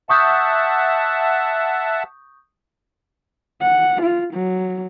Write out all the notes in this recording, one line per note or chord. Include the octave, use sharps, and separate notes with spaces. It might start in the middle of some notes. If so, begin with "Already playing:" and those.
E5 F#5 A5 C#6 D#6 G6
F#5
F4
F#3